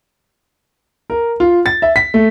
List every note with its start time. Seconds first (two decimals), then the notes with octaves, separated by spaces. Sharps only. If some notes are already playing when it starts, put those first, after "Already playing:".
1.10 A#4
1.40 F4
1.66 A6
1.82 E5
1.96 B6
2.14 A3